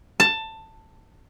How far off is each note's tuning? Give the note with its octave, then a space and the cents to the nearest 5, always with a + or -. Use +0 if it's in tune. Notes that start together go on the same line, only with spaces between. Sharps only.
A5 +15